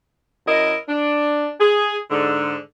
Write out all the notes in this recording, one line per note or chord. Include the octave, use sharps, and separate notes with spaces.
F#2 E4 A#4 D#5
D4
G#4
G#2 D3